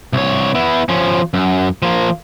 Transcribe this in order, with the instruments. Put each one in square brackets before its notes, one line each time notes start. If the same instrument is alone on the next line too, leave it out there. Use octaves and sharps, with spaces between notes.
[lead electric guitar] C2 C#5
B3 E4
F3 C#4
F#2
F3 A#3